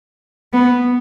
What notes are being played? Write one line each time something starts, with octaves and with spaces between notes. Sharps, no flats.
B3